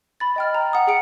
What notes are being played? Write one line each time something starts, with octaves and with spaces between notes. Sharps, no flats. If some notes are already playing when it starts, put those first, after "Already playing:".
B5 A6
D#5 G5 F6
A#5
F#5 D#6
G#4 G5 C#7 D7